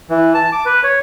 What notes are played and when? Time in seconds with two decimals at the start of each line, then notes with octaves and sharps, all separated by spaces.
0.10 E3
0.34 A5
0.52 D6
0.65 B4
0.84 C#5